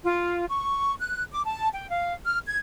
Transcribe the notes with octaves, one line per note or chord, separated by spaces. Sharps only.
F4
C#6
F#6
D6
A5
G5
F5
F6
G#6